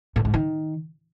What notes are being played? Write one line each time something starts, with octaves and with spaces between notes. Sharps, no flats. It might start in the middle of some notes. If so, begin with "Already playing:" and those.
A2
G#2
D#3